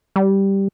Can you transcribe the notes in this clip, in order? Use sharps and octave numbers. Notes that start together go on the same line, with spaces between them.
G3